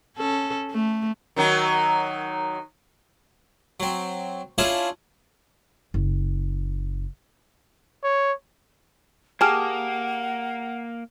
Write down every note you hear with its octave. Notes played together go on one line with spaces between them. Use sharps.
C#4 A4
A3
D#3 F#3 D#4
F#3 C4
C#4 D4 E4 F4 G#4 A5
F#1
C#5
A#3 G4 G#4 F#5 A5 F6